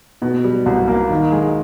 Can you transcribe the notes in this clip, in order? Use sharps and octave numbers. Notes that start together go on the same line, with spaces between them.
B2
G3
C2
A#3
D#3
G#3